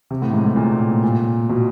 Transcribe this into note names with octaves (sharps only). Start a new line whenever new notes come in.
C3
A2
G#2
A2
A#2
A#2
B2